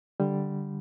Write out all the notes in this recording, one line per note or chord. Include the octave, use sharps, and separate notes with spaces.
D3 G3